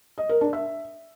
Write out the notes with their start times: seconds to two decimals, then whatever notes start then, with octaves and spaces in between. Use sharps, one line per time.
0.18 D#5
0.29 A#4
0.41 D4
0.53 E5